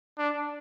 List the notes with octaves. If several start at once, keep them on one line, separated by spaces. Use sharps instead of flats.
D4